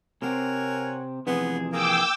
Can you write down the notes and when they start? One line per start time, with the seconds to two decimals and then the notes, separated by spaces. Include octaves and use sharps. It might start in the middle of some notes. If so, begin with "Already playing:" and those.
0.22 C3 C4 A#4 C#5 F#5 G#5
1.27 F2 C3 E3 B3 G#4
1.72 A#3 G#4 G5 D6 E6